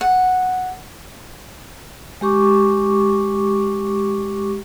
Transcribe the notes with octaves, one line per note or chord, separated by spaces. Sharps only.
F#5
G#3 G4 C#6 D6